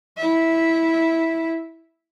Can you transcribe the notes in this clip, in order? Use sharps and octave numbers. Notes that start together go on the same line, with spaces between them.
E4 E5